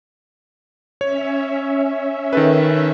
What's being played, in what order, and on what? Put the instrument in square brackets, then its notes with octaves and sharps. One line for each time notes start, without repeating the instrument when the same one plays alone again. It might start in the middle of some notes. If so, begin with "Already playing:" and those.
[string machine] C#4 E5 [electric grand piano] C#5
[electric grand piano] D#3 A4 B4